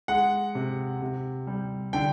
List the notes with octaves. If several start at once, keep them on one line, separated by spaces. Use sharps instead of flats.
G#3 F#5
C3
C3
G3
D3 G5